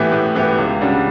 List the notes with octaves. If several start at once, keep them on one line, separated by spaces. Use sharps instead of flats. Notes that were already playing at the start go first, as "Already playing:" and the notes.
Already playing: A2 E3 B3 E4 G4
A2
E3 B3 E4 G4
C#2
C#3 G3 D4 F#4